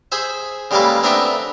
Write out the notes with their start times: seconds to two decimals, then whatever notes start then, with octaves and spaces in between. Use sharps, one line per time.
0.12 G#4 C5 E5
0.71 C#3 G3 G#3 A#3 A4 B4
1.03 A3 B3 C4 D4 A#4 B4